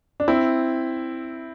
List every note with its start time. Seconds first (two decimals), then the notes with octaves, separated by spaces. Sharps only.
0.20 D4
0.28 C4 E4